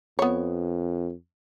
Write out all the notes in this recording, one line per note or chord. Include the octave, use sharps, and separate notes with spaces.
F2 B3 C#5